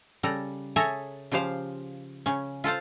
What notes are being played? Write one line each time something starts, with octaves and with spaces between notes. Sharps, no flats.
C#3 G3 A4 A#5
G#4 A4 C#5 E5 G#5 A#5
C#3 F3 G4 C5 F5
C#3 C#4
F4 A4 C5 F5